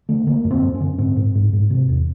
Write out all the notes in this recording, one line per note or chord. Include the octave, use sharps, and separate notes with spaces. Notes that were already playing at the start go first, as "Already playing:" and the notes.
D3 A3
D3 A#3
F#2
C4
F#2
C#4
D3
G#2 C4
G#2
G#2
G#2
C3
E2